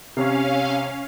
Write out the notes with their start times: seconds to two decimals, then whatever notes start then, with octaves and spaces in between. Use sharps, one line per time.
0.17 C3 C#4 F5